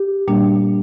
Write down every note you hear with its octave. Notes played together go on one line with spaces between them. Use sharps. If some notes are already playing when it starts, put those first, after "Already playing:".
Already playing: G4
A#2 G3 A#3 D4